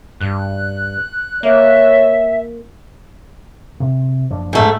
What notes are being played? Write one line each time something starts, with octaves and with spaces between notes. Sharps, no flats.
G2 F#6
A#3 C#5 E5
C3
F#1 F3 D4
G#2 A3